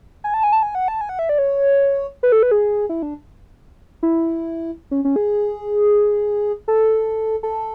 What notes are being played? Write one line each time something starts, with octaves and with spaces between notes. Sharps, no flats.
G#5
A5
G#5
A5
G#5
F#5
A5
G#5
F#5
E5
D5
C#5
B4
A4
B4
G#4
E4
D4
E4
C#4
C#4
G#4
A4
A4